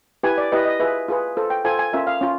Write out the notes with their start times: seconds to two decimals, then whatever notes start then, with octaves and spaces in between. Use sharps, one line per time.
0.23 E4 G4 B4 G#5
0.38 D5
0.52 E4 G4 B4 D#5
0.66 D#5
0.80 F4 G#4 B4 E5
1.08 F4 G#4 B4
1.37 F4 A4 C5
1.50 G5
1.65 F4 A4 C5 G#5
1.79 G#5
1.93 C#4 F4 A#4 E5
2.07 F5
2.21 C#4 F4